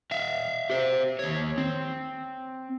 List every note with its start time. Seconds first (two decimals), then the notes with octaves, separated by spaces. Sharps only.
0.11 E5 F5
0.70 G4 C5
1.19 D#2 C#5
1.58 C4